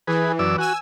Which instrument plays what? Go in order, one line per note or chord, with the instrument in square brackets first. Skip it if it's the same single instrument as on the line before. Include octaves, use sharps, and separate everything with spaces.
[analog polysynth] E3 [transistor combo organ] G#4 B4
[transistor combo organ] F#2 D5 E6
[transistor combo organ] F#4 [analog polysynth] G#5 E6